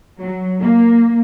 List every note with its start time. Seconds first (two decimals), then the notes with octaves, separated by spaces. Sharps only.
0.21 F#3
0.60 A#3